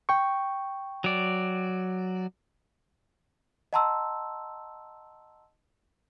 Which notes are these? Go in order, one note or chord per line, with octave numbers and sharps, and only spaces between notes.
G5 C#6
F#3 D5
D#5 F#5 A5 A#5 C6 E6